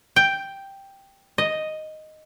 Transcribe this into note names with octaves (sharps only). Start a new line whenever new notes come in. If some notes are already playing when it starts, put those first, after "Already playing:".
G5
D#5